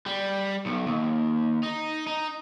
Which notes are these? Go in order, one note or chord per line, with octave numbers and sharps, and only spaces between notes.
G3
B1
D#2
D#4
D#4